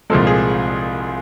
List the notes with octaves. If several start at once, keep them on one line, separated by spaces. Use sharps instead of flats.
C2 A#2 F3 G#3 A4
G#4